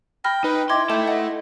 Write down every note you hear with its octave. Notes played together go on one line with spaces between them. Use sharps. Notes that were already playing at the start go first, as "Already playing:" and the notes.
G5 B5 F6 A#6
D#4 B4 G5
E4 D#5 G5 C6 D6 G#6
E4 A4 E5 G6 E7
D#5 F#5